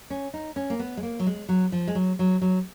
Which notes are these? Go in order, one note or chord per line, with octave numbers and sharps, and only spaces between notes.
C#4
D#4
C#4
A#3
B3
G#3
A#3
F#3
G#3
F#3
F3
G#3
F#3
F#3
F#3